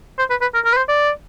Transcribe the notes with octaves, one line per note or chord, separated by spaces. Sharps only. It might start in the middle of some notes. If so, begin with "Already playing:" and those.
C5
B4
B4
A#4
A#4
B4
C5
D5